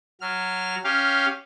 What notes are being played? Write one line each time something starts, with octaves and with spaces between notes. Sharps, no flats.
F#3 F6
C#4 G4 F5